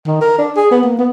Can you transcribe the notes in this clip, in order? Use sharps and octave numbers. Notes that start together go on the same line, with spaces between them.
D#3
A#4
D4
G#4
B3
A#3
B3